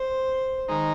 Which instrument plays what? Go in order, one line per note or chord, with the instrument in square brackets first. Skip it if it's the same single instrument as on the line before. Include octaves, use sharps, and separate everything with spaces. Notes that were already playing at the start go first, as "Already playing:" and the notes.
Already playing: [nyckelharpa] C5
[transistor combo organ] D#3 G#3 D#4